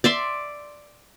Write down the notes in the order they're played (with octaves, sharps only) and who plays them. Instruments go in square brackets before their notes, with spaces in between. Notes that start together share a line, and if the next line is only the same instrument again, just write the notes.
[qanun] D5 E5 C6